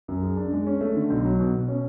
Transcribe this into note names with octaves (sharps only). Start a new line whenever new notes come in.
F#2
G#4
D4
G#3
C#4
A3
D3
B1
F#3
B2
B2
C#4